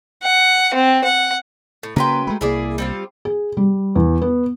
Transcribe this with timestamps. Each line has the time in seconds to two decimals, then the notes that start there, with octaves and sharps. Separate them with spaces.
0.23 F#5
0.74 C4
1.04 F#5
1.83 A2
1.96 C#3 F#3 A#3 B4 G5 A#5 C6
2.27 G#3 A3 B5
2.41 C2 A#3 E4 G#4 D5
2.78 G3 C4 F4
3.25 G#4
3.57 G3
3.95 E2
4.22 B3